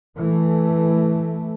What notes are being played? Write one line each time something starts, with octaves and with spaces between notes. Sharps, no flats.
E3 A3